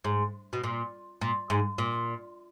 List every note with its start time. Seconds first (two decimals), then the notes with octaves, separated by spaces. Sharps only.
0.04 G#2
0.53 B2
0.64 A#2
1.21 A#2
1.50 G#2
1.78 A#2